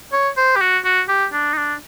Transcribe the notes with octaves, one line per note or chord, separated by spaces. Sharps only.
C#5
C5
G4
F#4
F#4
G4
D4
D#4
D4